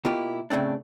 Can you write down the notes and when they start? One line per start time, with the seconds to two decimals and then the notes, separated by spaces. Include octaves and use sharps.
0.05 B2 A#3 E4 F4 G4
0.50 A2 C#3 A3 C4 D4